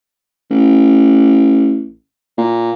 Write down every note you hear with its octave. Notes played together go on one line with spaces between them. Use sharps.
A1
A#2